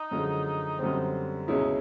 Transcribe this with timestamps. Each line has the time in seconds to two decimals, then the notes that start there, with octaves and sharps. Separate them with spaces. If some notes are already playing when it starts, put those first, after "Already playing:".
Already playing: D#4
0.11 F#2 D3 F3 G#3
0.79 F#2 D3 G3 C4
1.47 C#2 B2 G#3 C#4 D#4 E4